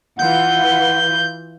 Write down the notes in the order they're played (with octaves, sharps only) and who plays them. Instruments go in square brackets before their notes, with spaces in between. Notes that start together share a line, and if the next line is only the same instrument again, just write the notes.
[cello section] E3 F4 B4 [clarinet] F#5 [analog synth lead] G6